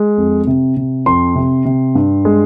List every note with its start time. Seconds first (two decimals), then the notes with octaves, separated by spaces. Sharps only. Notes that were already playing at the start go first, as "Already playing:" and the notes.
Already playing: G#3
0.18 F2
0.47 C3
0.77 C3
1.06 F2 C6
1.35 C3
1.65 C3
1.95 G2
2.25 G#3